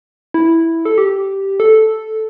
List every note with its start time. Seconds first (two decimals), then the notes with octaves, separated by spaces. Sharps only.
0.34 E4
0.85 A4
0.98 G4
1.60 A4